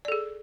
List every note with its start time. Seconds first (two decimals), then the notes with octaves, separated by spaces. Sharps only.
0.05 D5
0.08 A4
0.12 G#4